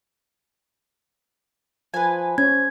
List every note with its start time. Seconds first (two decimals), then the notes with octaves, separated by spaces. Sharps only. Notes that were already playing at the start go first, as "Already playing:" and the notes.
1.94 F3 B4 G#5
2.38 C#4 C5 G#6